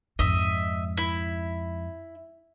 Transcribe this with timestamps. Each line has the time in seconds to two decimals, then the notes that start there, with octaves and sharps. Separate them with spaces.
0.19 F2 G#2 D#5 E5
0.98 E4